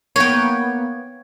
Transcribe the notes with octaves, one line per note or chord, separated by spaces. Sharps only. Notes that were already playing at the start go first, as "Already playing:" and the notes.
A#3 B3 C#5 G5